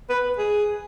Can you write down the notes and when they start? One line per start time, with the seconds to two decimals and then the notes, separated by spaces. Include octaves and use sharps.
0.10 B4
0.38 G#4